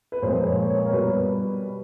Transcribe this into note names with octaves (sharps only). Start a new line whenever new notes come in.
B4
A#2 F3 G#3 C5
C#5
C#5
A#4
B2 G3 B4